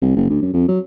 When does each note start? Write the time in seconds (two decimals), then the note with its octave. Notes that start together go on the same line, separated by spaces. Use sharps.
0.02 C2
0.17 F#1
0.30 D2
0.42 F#2
0.54 F2
0.68 F#3